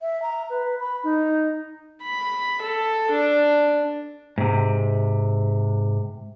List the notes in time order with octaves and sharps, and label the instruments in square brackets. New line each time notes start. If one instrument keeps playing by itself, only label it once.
[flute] E5
A#5
B4
B5
D#4
[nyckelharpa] B5
A4
D4
[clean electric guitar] G#2 C3